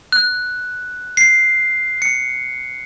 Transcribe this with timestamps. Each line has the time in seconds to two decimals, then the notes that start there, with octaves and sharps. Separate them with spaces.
0.12 F#6
1.17 C7
2.02 C#7